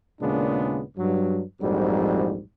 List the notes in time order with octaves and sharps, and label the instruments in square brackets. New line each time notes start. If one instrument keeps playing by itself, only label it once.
[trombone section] D#2 A#2 C#3 G#3 B3 D4
G2 F#3
A#1 F2 G#2 F#3 G3